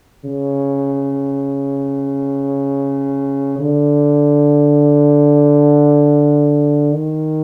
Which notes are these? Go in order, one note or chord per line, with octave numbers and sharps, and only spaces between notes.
C#3
D3
D#3